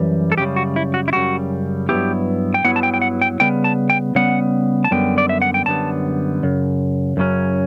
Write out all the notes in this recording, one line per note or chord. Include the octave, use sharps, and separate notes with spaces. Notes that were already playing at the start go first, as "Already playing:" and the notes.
Already playing: F#2 E3 G3
A4
F#2 C#3 G3 G4
F#4
E4
F#4
E4
F#2 C#3 G3 F#4
G2 F#3 B3 E4 G4
G5
G2 F#3 B3 E4 F#5
A5
G5
G5
F#5
G5
C#3 G3 B3 G5
A5
G5
C#3 G3 B3 F#5
A5
F#2 D3 G3 B3 G5
D5
E5
F#5
G5
F#2 D3 G3 B3 A5
F#2 C#3
F#2 C#3 F#3 C#4